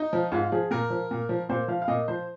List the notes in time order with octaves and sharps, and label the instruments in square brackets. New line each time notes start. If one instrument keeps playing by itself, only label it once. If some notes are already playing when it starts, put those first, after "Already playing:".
Already playing: [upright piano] D#4
F3
G#2 F4
F3 G#4
A#2 A#4
F3
A#2
F3
A#2 C5
F3 F5
F5
A#2 D#5
F3 C5